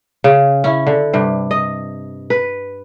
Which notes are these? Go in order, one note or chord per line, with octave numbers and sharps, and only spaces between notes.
C#3
C#4 E4
D3
G2 C3
D#5
B4